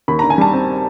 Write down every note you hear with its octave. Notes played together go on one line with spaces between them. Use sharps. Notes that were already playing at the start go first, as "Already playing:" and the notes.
D#2 B5
A#5
D3
G#5
G3 A5
C4